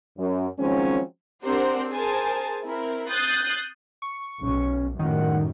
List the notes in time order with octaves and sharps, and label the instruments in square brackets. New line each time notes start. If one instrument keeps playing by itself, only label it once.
[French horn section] F#2
D#3 F3 F#3 G#3 C4 C#4
[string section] C4 D4 G4 A#4 C5 F#5
G#4 A#4 C5 G#5 A5
C4 E4 A#4
D#6 F#6 G6 A6 C7
[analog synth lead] C#6
[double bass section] B1 [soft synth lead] C#4
[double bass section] F#2 A2 G3 [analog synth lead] D#3 [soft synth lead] F#5